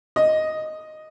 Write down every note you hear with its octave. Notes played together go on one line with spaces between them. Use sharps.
D#5